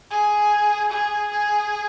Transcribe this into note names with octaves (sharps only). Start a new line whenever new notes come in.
G#4
G#4
G#4